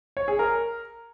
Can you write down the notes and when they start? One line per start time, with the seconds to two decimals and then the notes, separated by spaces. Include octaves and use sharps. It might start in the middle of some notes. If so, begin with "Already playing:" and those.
0.17 C#5
0.28 G#4
0.39 A#4